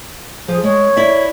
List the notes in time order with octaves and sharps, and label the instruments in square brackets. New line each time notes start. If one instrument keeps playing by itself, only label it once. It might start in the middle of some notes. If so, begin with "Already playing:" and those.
[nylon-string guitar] F3 [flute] G#4
[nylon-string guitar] G#3 [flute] C#5
[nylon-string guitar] E4 D5 E5